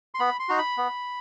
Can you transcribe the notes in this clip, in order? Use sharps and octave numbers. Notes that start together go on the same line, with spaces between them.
C6
B3 B5
C6
D#4 F#4 A#5
B5
B3